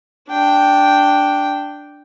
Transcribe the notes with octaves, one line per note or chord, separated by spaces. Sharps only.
D4 G5